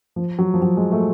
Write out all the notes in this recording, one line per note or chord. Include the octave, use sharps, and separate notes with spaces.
F3
F#3
F3
F#3
G#3
A3